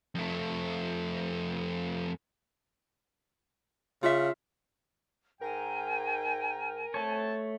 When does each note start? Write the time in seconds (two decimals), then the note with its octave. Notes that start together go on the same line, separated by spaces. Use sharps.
0.15 F2 A3
4.03 C#3 F4 E5
5.41 G#2 A#4 G5 G#5
6.94 A3 C4 C#5 A5